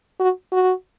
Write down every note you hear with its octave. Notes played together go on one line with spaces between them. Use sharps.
F#4
F#4